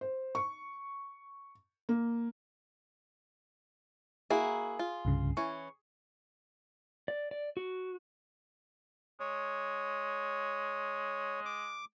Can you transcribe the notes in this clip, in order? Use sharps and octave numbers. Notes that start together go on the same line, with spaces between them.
C5
C#6
A#3
A#3 E4 F#4 G#4
F4
C2 G2 C#3
E3 C#4 C#6
D5
D5
F#4
G#3 C#5
D6